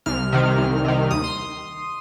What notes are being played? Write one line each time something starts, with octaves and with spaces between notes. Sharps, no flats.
C2 F6
C3 D#3
C2
C3 D#3
D#2 D#6
C6